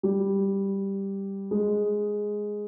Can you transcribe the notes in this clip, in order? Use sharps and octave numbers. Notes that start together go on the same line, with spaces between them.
G3
G#3